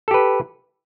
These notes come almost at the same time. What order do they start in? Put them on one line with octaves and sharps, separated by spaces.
A4 G4 B4